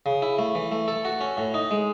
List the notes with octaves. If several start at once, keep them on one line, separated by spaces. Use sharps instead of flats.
C#3
E4
A3
E3
A3
A4
F#4
C#4
A2
D#4
G#3